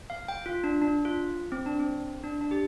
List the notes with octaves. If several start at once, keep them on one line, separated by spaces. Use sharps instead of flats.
F5
G5
F4
D4
D4
F4
C4
D4
C4
D4
D4
G4